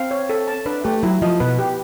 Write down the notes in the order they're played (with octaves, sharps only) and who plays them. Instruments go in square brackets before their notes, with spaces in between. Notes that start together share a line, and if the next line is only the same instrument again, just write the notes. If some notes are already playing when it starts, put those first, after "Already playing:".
Already playing: [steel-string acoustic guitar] C4 [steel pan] F5
[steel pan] C#5
A4
A5
[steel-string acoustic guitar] D4 [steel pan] B4
[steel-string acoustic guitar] A3 [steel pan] G4
[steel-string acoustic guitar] F#3 [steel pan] E4
[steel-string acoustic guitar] F3 [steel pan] D#5
[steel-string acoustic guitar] B2 [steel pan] B4
[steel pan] G4